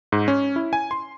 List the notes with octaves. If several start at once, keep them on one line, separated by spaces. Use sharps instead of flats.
G#2
C#4
E4
G#5
C6